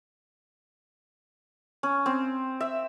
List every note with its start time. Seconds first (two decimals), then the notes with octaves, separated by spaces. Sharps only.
1.83 C#4
2.06 C4
2.60 E5